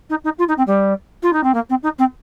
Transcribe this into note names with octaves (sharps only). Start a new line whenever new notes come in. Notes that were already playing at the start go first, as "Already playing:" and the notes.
D#4
D#4
F4
D#4
C4
G3
F4
D#4
C4
A#3
C4
D#4
C4